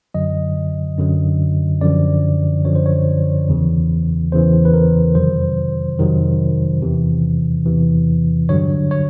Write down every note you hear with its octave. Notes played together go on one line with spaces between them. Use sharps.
F#2 D3 F#3 D#5
F#2 D3 F#3
F#2 D3 F3 D5
F#2 D3 F3 C#5
C5
C#5
E2 C#3 E3
E2 C#3 E3 C5
B4
A#4
F2 C3 D#3 F#3 C5
F2 C3 D#3 F#3
E2 C3 E3
E2 C3 E3
G2 D3 F#3 C#5
C#5